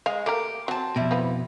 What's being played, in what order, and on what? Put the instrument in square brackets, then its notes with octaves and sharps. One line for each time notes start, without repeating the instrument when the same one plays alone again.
[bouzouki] G#3 [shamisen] F5
[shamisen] A3 A#3 A#4 [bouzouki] G4
[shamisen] F#3 [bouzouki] C4 A5
[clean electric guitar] F2 B2 [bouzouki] G3 E4
[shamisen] F3 B4